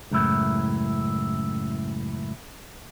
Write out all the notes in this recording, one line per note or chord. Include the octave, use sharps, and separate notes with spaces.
C#2 F#2 A2 E4